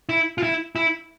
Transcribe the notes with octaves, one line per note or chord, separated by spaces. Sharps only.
E4
F4
E4
E4